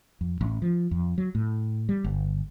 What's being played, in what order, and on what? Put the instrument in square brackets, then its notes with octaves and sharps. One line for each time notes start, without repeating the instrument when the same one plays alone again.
[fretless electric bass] F2
A1
F3
F2
F#3
A2
G3
G1